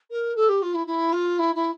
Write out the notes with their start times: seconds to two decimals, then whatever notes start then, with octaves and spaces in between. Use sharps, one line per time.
0.10 A#4
0.36 A4
0.48 G4
0.62 F4
0.74 E4
0.87 E4
1.12 F4
1.38 E4
1.55 E4